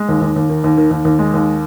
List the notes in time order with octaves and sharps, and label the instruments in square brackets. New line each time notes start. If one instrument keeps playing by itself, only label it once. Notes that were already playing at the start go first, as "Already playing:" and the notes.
Already playing: [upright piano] G#3
D#2
D#2
D#2
D#3
D#2
D#3
D#2
D#2
G#3
D#2